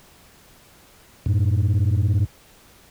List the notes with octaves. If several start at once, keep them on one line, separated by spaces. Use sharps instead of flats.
F#2 A2